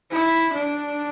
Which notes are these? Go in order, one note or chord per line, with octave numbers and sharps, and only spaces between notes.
E4
D4